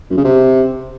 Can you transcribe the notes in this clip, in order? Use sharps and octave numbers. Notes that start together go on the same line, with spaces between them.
F#2
C#3
C3